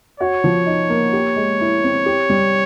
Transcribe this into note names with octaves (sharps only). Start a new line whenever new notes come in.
F#4 C#5
F3
D#4
A#3
G4
G#3
E4
C4
G4
G3